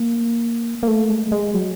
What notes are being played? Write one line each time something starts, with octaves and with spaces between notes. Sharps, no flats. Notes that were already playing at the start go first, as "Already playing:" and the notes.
Already playing: A#3
A#3
A3
G#3
G#3
F#3